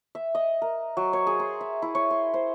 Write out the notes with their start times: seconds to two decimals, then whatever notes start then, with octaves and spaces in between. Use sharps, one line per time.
0.15 E5
0.35 D#5
0.62 A#4
0.97 F#3
1.13 C#5
1.27 G#4
1.40 C6
1.61 E5
1.82 E4
1.95 C#5
2.11 C6
2.34 C5